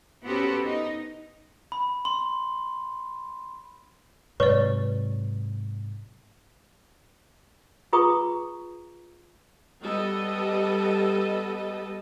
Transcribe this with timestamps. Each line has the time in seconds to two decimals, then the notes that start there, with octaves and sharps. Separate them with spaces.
0.25 B3 C#4 F#4 G4 A4 C5
0.63 D#4
1.72 B5
2.05 C6
4.40 G#2 C3 F#3 B4 C#5 D5 C#6
7.93 F4 G#4 B4 A#5 C#6 D#6
9.83 G3 B3 A4 D#5